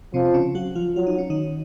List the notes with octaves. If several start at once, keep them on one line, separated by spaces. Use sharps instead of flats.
C3 F3 C4
C4
C#3 C#4
F#3 F#4
F3 F4
F#3 F4
D#4
C#4
D#3 D#4